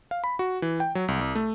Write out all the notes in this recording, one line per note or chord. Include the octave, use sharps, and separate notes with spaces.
F5
B5
F#4
E3
G5
F#3
C2
C2
A3